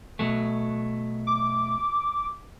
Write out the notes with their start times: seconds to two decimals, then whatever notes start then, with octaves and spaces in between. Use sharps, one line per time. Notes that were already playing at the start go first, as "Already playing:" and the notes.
0.19 B2 F#3 A3
1.27 D6